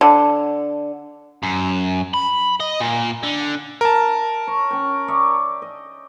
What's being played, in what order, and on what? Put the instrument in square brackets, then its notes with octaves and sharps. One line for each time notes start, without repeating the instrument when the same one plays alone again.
[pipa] D3
[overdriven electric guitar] F#2
B5
D#5
A#2
D3
[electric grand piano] A#4 A5
[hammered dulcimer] C#5
C#4 G5
C#5 D5 E5
D#5